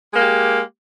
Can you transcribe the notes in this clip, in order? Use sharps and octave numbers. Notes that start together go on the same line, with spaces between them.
G#3 A#3 G4